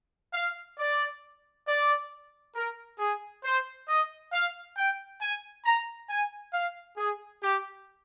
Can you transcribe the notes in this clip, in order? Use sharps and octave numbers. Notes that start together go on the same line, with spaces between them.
F5
D5
D5
A#4
G#4
C5
D#5
F5
G5
G#5
A#5
G#5
F5
G#4
G4